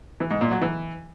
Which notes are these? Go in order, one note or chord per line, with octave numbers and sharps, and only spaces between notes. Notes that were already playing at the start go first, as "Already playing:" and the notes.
E3
G#2
A#2
F#3
E3